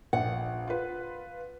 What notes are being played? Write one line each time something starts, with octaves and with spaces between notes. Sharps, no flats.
A#1 F#5
F4 B4